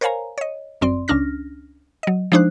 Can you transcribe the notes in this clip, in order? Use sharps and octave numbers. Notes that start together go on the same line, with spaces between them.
A#4 C5 C#5 F5 G#5 A#5
C#5 D#5
G1 F#2 C4 D5 C6
C#2 C#4 D4 F6 A#6
F#3 D#5
F3 G#3 D4 D#4 C5 F#6